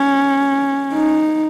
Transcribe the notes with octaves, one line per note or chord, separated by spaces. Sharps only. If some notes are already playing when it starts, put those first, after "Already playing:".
Already playing: C#4
D#4